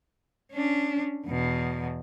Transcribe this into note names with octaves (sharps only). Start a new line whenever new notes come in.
C#4 D4
E2 B2